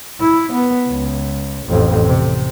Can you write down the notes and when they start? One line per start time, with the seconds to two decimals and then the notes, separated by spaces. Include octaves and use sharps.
0.20 E4
0.53 B3
0.87 C#2
1.68 A1 F2
2.06 C3